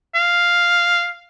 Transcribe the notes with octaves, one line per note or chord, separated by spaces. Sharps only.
F5